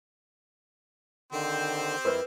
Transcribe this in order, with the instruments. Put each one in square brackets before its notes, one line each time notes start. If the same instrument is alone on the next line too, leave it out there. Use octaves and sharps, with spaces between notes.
[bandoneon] D3 D#3 [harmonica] C4 G4 C5
[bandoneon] F2 E4 [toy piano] A#4 B4